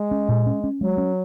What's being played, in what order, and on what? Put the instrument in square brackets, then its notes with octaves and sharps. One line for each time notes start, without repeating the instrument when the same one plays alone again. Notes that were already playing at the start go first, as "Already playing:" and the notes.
Already playing: [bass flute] G#3
[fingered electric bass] C#4
A#2
C#4
C#4
[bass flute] F#3 [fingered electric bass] G#3
[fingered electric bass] C#4